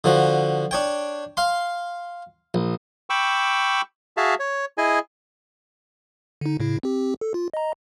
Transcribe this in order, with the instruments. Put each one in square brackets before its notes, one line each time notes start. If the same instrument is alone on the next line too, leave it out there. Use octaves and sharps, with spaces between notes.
[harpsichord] D3 F3 F#4
D4 C#5 G5
F5 C6
A#1
[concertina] G5 B5 C#6 D6 E6
F#4 G#4 E5 F5 A5
C#5
E4 G#4 D#5 G#5
[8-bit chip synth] D3 D#4
A2 C#3 E4
C4 G4
A4
F4
D#5 A#5